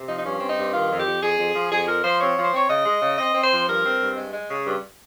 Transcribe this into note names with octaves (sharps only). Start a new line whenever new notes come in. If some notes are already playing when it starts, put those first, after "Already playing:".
Already playing: C3
F3 D#4
D#4
G2 C#4
C4
D#4
G2
D#3 F4
F2
G4
F2
F2 G#4
F2
F3
F2 G#4
F3 A#4
F3 C5
C4 C#5
F3
C5
C4 C#5
C#3 D#5
G#3
C#3
C4 D#5
C4
C5
F3
G2 A#4
C4
G2
G#3
G#3
C#3
G2